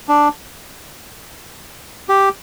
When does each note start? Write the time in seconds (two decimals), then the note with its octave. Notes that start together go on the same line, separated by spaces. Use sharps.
0.08 D4
2.09 G4